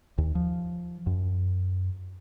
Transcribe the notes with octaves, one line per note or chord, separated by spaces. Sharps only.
D#2
F3
F#2